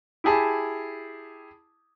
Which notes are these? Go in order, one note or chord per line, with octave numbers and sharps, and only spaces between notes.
E4 G4 G#4 A5 B5